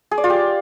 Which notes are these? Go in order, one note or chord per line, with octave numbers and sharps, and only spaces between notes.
G#4
D5
F4
G4